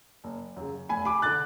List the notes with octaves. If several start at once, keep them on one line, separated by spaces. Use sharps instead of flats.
F#1
F#2 C#3
F1 G#5 B5
B5 D6
D3 F#6 A6